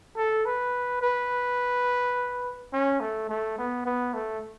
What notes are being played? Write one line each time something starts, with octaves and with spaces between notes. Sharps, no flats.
A4
B4
B4
C#4
A3
A3
B3
B3
A3